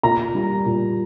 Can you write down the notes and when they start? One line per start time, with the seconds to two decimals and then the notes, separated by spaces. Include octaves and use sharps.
0.03 A#2 A#5
0.35 G3
0.66 A#2